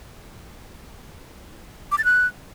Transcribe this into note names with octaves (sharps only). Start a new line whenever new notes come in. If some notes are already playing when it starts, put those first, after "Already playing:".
D6
A6
F#6